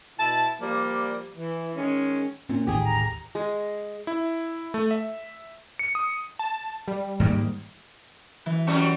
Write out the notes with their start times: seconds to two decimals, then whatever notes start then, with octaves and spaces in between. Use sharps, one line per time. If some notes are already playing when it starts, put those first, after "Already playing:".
0.19 B2 E4 A5
0.61 F3 G3 A#3 D5
1.36 E3
1.75 D#3 G#3 C#4
2.49 A#2 C4 C#4
2.67 D#1 A1 D#3 G4 G#4
2.82 A#5
3.35 G#3
4.07 E4
4.74 A3
4.91 E5
5.79 C#7
5.95 D#6
6.39 A5
6.88 G3
7.20 G#2 D#3 A#3
8.46 E3
8.67 F#2 F#3 G3